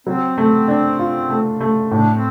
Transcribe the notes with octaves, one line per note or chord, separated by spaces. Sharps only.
F#3 C4
A3
D4
F4
A3
A3
A2 D4
C4